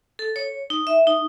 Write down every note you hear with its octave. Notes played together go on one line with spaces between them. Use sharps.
A4
C#5
D#4
E5
D#4